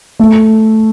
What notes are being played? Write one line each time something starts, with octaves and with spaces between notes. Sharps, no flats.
A3